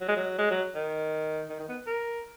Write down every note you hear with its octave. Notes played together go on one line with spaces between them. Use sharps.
F#3
G#3
F#3
G#3
F#3
D#3
D#3
D#3
B3
A#4